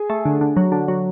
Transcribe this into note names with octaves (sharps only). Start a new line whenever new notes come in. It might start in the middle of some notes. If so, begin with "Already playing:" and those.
Already playing: G#4
A3
D3
D3
F#3
D3
F#3